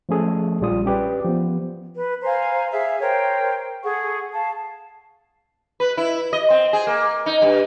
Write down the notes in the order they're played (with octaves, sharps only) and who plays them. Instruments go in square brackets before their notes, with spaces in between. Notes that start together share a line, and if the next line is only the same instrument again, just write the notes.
[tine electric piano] F3 A3 C#4 G#4 A4
A#1 G3 F4 D#6
C#4 G4 B4 D5
F3 B3
[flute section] B4
C5 F5 G#5 A#5
G#4 E5 F5
A#4 C5 C#5 G5
G#4 A4 F#5 C#6
F5 A5
[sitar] B4
E4
D#5
C4
G#4
A#3
D#4
G2